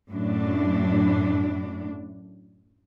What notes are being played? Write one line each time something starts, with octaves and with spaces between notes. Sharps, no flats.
F#2 A2 D4